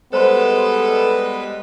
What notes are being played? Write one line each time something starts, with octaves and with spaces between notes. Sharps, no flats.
G3 G#3 B3 A4 B4 C5 B5 C6